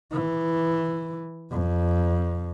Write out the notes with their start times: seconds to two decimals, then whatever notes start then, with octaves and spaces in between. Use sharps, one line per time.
0.11 E3
1.51 F2